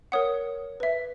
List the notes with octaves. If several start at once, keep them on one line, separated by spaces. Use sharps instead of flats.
A#4 C#5 F#5 D#6
B4 E5